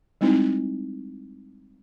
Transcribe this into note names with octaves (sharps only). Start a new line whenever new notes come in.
G3 G#3 C4 D#4 E4